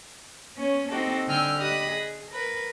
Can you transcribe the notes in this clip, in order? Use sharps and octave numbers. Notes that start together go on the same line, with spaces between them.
B3 C#4 C#5
C4 D#4 F#4 G4 A4
D3 G5 G#5 E6 F6 G6
G4 D#5 B5 D#6 F#6
G#4
A#4 B4